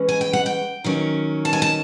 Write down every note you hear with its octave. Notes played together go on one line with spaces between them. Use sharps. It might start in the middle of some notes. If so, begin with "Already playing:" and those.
Already playing: E3 G#3 C#4
G#5
G5
F#5
G5
D#3 F#3 A#3 C#4
A5
G#5
A5